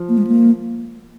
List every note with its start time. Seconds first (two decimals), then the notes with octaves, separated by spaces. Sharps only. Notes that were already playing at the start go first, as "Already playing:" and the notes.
Already playing: F3
0.09 A#3
0.18 G#3
0.27 A#3